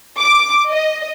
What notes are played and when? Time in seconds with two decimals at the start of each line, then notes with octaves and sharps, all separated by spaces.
0.19 D6
0.71 D#5